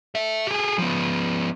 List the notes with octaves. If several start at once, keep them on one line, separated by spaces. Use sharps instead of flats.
A4 E5
G4 G#4
F3 B3